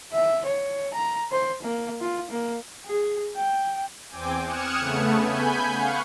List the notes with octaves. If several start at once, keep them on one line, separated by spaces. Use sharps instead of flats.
E5
C#5
A#5
C5
A#3
F4
A#3
G#4
G5
E2 C4 G5 G#5 D6
D#6 F6 F#6 G#6 C#7 E7
C#3 A3 B3
G#5 B5 G6
F5 F#5 C#6